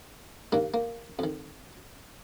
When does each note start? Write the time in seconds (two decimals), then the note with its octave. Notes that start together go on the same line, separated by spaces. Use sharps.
0.52 G2 D#3 A#3
0.74 A#3
1.19 F2 D#3